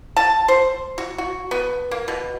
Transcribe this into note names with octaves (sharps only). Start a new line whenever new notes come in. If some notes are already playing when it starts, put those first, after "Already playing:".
A5
C5
F#4
F#4
B3
A#3
B2